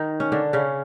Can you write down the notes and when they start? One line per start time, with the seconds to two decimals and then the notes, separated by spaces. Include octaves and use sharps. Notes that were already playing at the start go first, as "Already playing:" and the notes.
Already playing: D#3 D#4
0.20 C#4
0.32 D3 D4
0.53 C#3 C#4